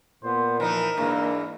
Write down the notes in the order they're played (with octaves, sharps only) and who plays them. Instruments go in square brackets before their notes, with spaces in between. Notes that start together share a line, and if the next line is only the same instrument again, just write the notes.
[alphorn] A#2 [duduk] B3 [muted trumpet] C5
[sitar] E3 D#4 [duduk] F3 [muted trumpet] A#4
[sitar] G#2 E3 [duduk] A#3 [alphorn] D4